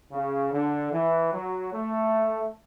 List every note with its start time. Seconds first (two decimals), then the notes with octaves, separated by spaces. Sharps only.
0.11 C#3
0.52 D3
0.92 E3
1.32 F#3
1.72 A3